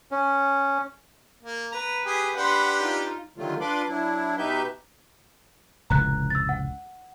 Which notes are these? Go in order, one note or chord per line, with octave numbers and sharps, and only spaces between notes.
C#4
A#3
B4 A#5
G4 G#4
D4 G4 B4 F#5 B5 C6
D#4 F4
D3 D#3 F#3 G3 A3 F4
D4 F4 B4 B5 C6 D6
F#3 D4 E4
B2 D#4 G4 B4 E5 G6
F1 C#2 A2 A#5 F#6
E6 A6
F#5